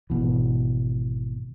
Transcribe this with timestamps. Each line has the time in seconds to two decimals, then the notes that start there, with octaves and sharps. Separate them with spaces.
0.10 G#1 B2 E3